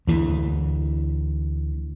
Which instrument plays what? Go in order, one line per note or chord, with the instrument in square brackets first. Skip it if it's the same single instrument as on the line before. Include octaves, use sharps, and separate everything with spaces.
[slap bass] D2 E3